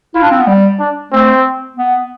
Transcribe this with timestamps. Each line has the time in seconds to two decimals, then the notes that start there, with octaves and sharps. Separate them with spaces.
0.15 E4 F4
0.23 D4
0.31 C4
0.40 B3
0.47 G3
0.79 D4
1.12 A3 C4
1.77 B3